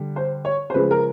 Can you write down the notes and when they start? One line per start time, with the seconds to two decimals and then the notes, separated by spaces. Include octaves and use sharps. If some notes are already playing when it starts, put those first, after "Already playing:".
Already playing: D3 G3
0.16 C5
0.45 C#5
0.70 C5
0.74 C#3 F3 G#3 B4
0.91 A#4